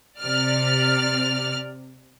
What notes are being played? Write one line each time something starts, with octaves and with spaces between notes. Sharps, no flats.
C3 D5 F6